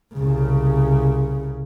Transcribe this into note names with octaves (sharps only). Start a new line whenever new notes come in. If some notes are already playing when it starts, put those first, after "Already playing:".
C2 C#3